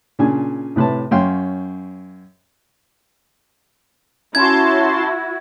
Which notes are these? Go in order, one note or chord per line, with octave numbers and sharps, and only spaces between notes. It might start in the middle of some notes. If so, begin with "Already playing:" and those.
A#2 C#3 D4 G#5
A2 C3 B4 C#5 A5
F#2 C#4 F5 G5 C6
C#4 E4 F#4 A5 C6 G#6